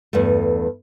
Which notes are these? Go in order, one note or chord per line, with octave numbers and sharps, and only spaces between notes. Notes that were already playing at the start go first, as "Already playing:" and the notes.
E2 G2 A3